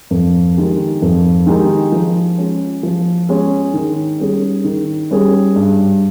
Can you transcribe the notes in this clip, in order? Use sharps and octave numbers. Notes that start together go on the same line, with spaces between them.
F2
D#3 G#3 D#4 G4
F2
D#3 G#3 D#4 G4
F3
G#3 C#4
F3
G#3 C#4
D#3
G3 C#4 G#4
D#3
G3 C#4 G#4
G2